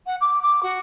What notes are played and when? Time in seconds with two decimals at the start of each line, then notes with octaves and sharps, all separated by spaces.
0.07 F#5
0.21 D6
0.43 D6
0.63 F#4